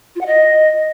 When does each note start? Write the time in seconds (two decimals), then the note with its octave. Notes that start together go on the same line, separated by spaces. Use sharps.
0.15 F4
0.21 F#5
0.26 D#5